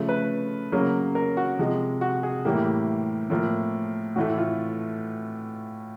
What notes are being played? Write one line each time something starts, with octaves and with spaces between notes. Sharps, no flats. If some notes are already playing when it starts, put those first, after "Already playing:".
Already playing: C#3 F3 A3
B4
C#3 F#3 A#3
A#4
F#4
C3 F3 G#3
F#4
G#4
A2 E3 G3 A#3 G4
A2 F3 A#3
A2 E3 A3 F#4
F4